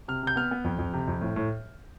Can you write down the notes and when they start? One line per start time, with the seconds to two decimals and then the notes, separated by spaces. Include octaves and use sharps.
0.08 C3 F6
0.23 C3 G6
0.36 B3 F6
0.51 B3
0.64 F2
0.79 F2
0.93 C3
1.08 F2
1.21 A2
1.36 A2